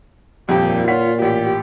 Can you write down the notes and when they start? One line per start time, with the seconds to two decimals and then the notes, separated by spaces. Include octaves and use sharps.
0.49 D#1 F2 A#2 G4
0.88 F4 C#5 F#5 B6
1.22 A1 G4